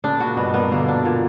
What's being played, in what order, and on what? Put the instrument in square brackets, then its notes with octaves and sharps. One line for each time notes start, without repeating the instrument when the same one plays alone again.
[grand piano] A#2 C#3 [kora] D4
[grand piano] A#2 [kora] F#4
[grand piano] G2 B2 [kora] B3
[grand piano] F#3 A#3 [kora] B3
[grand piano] B2 D3 [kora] A#3
[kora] D4
A#2